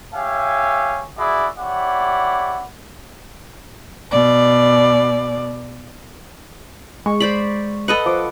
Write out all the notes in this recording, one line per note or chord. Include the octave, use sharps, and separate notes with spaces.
G4 C#5 E5 F5 G#5
E4 F#4 G#4 D5 E5
E4 G4 C#5 D5 F#5
B2 D5
G#3 C#6
C5 D5 B5
A4 B4 D#5 F#5
F3 D6